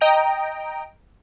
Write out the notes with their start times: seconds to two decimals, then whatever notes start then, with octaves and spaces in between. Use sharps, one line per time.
0.01 D#5 G5 A#5 D7